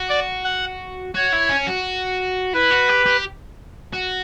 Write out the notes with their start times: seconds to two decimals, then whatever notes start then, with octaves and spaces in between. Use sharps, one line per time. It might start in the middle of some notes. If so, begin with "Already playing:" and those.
Already playing: F#4
0.09 D5
0.44 F#5
1.14 F#4 C#5
1.32 E4
1.49 C#4
1.67 F#4
2.54 E4 B4
2.71 F#4
2.89 G4
3.06 G4
3.93 F#4